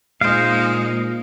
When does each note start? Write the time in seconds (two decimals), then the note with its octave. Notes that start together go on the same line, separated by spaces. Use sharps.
0.21 A#2 G#3 D#4 C5 F5